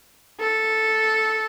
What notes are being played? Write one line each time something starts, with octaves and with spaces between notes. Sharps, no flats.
A4